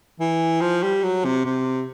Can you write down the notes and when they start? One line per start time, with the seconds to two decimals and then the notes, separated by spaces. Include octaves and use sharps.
0.20 E3
0.61 F3
0.83 G3
1.03 F#3
1.25 C3
1.46 C3